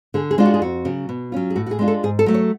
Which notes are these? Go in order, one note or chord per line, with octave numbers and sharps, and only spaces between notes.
D3 G#4
G#4
G#3 D4 F4
F#4
G#4
F2 F#4
C#3 F#3
B2
F#3 C#4 F4
G#4
A2 F#4
F#4
G#4
G#3 D4 F4
A4
G#2 G#4
A4
F#3 A3
C#5